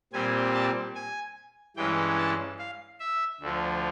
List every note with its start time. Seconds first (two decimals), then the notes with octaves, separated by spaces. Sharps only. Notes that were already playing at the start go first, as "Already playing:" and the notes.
0.13 A#2 G3 C4 G#5
0.53 A5
0.95 G#5
1.77 G2 E3 G#3 C#4 G5
2.18 A5
2.59 F5
3.00 E5
3.41 D2 D3 F3